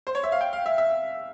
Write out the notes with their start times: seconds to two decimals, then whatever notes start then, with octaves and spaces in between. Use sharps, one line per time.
0.07 C5
0.15 C#5
0.24 E5
0.32 F5
0.41 G5
0.53 F5
0.66 E5
0.78 E5